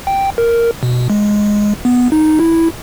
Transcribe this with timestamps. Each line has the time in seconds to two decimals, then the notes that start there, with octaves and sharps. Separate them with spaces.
0.07 G5
0.38 A#4
0.83 B2
1.10 G#3
1.85 B3
2.12 D#4
2.40 E4